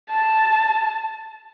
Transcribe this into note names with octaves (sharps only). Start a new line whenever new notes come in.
A5